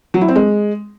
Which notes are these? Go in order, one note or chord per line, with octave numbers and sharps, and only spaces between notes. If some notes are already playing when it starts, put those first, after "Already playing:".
F#3
E4
C4
G#3